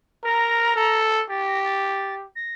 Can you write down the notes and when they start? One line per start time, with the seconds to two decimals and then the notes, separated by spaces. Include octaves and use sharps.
0.23 A#4 A#5
0.76 A4
1.29 G4 A6
1.46 A#6
1.64 A6
2.35 A#6